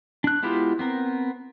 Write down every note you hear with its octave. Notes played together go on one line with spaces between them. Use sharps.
D4 F#6
G#3 B3 E4 F4 G4
B3 C4 A#4